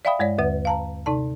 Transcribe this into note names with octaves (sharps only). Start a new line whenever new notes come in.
D5 E5 F5 G5 B5 D#6
G2 G#3 C#5 D5
D#2 D3 B4 F#5
F5 A5 A#5
C3 D#4 D5 A5